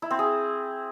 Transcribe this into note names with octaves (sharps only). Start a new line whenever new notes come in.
E4
C4
G#4